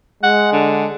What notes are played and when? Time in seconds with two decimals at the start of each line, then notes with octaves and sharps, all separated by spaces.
0.23 G#3 F#5
0.52 D3